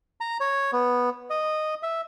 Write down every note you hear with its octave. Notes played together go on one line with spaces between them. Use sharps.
A#5
C#5
B3
D#5
E5